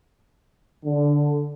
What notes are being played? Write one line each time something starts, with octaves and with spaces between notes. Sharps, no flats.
D3